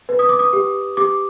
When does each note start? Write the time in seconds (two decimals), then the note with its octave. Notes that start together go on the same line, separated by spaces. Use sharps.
0.09 B4
0.19 D#6
0.29 D6
0.39 D#6
0.53 G4
0.97 G4 D6